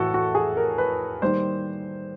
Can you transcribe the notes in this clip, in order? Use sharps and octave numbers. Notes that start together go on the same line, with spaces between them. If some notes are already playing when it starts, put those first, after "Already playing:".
Already playing: A2 E3 A3 F#4 A4
F#4
G#4
A#4
B4
D#3 G3 A#3 C5